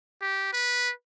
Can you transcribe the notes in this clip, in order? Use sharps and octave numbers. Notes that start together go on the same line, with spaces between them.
G4
B4